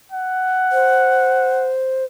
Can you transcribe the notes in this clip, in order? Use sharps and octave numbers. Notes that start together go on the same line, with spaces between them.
F#5
C5